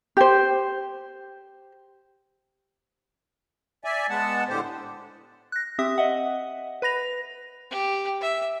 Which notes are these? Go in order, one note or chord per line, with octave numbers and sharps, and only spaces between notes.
G4 C5
D5 E5 G#5
G#3 B3 F#5 A5
A2 D3 G4 C5
F#6 A#6
C4 G4 E5 D#6 B6
D#5 E5 F#5
B4 B5 A#6 F7
G4
E5